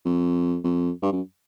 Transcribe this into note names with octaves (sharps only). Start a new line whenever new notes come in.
F2
F2
G2
F#2